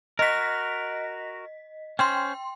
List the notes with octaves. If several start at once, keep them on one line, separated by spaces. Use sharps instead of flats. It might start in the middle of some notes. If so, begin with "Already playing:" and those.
F#4 A#4 D#5 B6
C#4 C5 G5 C6